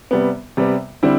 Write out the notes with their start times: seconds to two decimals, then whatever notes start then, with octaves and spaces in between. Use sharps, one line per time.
0.11 C3 G3 B3
0.57 C3 G3 B3
1.03 D3 G3 C4 E4